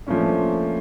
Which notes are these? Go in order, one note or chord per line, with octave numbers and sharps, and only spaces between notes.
F3 A3 A#3 C#4 D4